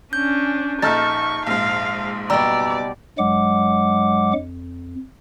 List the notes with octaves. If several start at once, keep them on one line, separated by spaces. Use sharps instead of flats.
C#4 D4 G6
A#1 D#4 A4 C#6 F6 A6
A#1 G#2 F5
F#1 B2 G3 D5 A#5 E6
G2 F#3 G#3 F#5 D6
F2